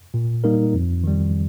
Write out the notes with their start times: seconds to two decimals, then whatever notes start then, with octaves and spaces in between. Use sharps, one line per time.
0.14 A#2
0.44 G3 A#3 D#4 A#4
0.74 F2
1.04 D#3 G3